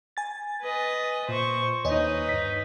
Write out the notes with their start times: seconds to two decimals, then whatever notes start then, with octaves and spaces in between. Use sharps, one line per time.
0.17 G#5 A6
0.61 B4 D#5
1.29 A#2 C5 C#6
1.85 D#2 D#4 B4 C#5 D#5 G#5
2.29 G2 B6